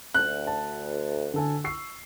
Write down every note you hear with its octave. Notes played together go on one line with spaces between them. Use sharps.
D2 F#6
A5
D3 A4 G#5
C#6 E6 C7